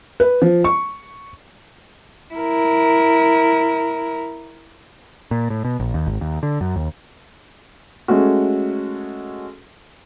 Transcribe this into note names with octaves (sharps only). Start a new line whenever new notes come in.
B4
F3
C#6
E4 A#4
A#2
A2
B2
A#1
D#2
G#1
D#2
D3
F#2
D#2
G#3 A3 C#4 F#4